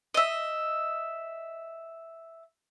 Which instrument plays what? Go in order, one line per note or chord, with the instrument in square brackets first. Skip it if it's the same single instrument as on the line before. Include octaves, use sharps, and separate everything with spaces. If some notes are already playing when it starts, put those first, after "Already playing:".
[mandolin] D#5 E5